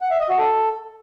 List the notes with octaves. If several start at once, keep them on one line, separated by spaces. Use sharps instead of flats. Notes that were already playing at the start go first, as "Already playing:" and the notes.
F#5
E5
D#5
F#4
A4